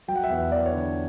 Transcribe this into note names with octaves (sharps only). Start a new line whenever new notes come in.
F#3 G5
F#5
E5
E2 F#5
E2 D5
C#5
D3